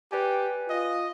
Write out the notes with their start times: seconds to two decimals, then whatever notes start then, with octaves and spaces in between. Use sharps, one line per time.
0.12 G4 B4 D5 G#5
0.70 F4 D#5